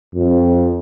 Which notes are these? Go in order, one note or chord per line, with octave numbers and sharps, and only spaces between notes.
F2